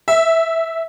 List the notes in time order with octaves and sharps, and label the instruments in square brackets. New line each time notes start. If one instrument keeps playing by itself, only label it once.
[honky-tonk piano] E5